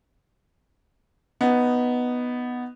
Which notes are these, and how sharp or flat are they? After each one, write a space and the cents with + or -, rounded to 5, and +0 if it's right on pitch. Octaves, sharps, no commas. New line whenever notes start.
B3 +0 D#4 +0